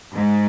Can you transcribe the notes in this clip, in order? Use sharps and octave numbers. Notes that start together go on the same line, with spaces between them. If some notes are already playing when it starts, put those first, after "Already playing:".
G#2